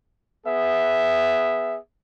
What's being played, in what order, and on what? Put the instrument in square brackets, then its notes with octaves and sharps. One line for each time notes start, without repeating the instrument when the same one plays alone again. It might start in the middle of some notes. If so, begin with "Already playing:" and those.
[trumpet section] B3 G#4 E5